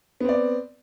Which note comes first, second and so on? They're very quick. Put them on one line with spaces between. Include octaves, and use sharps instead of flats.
B3 C4 D5